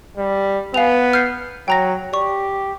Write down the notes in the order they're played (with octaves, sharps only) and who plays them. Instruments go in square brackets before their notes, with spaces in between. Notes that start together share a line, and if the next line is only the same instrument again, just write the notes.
[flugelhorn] G3
[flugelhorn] B3 [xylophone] F5 G#5 F7
[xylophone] F6 G6 C7
[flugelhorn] F#3 [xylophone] G5 A#5 A#6
[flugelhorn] G4 [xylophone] D5 C#6